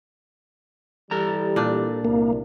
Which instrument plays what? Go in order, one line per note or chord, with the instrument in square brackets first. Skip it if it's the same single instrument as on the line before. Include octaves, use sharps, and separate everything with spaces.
[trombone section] E3 G3 [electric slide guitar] G4 A4 A#5
[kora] A#2 D4
[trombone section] C2 [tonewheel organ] A#3